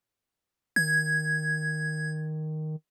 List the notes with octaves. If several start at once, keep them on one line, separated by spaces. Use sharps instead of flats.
D#3 G#6